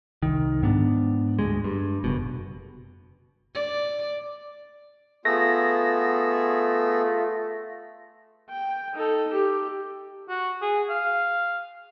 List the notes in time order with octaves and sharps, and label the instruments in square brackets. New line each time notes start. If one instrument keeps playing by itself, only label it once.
[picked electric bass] C2 D#3
G#2 B3 D4
D2 G#3
G2
F#1 B2
[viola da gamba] D5
[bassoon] A3 [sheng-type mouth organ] B3 G#4 E6 [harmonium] F4 [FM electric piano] A#6
[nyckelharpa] G5
D#4 A4
G4
[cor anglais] F#4
G#4
F5